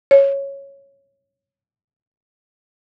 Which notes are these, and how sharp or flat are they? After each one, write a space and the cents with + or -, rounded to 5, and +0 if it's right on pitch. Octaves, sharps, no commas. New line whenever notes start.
C#5 -5